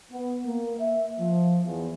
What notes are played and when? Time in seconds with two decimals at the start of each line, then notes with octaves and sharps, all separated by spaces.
0.12 B3
0.45 A#3
0.79 E5
1.20 F3
1.65 E2